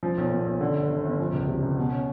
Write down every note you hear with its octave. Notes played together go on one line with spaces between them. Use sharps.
F3
B1
A#2
B1
D3
G1
G1
G1
F3
C#2
C3
C#2
B2
C#4